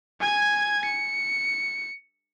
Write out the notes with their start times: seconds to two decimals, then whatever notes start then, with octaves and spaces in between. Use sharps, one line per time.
0.20 G#5 G#6
0.85 C#7